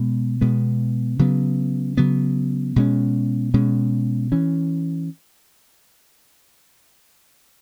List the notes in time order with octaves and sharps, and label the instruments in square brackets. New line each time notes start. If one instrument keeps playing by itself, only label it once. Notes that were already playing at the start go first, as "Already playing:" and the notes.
Already playing: [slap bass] B2 G#3 B3
B2 G#3 B3
C#3 F#3 B3
C#3 F#3 B3
B2 G#3 C#4
B2 G#3 C#4
E3 C#4